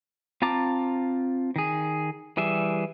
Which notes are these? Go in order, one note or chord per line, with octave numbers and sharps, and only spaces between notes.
C4 F4 A5 A#5 D6
D#3 G#4
E3 G3 G#4 E5